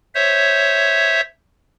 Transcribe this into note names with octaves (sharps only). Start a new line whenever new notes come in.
C5 C#5 E5